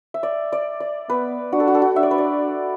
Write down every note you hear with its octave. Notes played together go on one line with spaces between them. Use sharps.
E5
D5
D5
D5
B3 B4
D4 F#4
A4
F#4
A4
F#4
D4 E5
D5
B4
D5